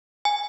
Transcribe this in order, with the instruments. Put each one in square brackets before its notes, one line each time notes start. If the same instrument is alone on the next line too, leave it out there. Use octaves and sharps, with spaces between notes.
[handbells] G#5